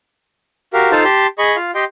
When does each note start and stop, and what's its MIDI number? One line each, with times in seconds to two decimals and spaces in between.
0.74 0.91 66
0.74 0.91 67
0.74 0.91 70
0.74 0.91 77
0.91 1.04 63
0.91 1.04 65
0.91 1.04 69
0.91 1.04 72
0.91 1.04 77
0.91 1.04 81
1.04 1.27 67
1.04 1.27 81
1.04 1.27 84
1.39 1.56 68
1.39 1.56 75
1.39 1.56 83
1.39 1.56 85
1.56 1.71 65
1.56 1.71 77
1.75 1.84 67
1.75 1.84 75
1.75 1.84 79
1.75 1.84 84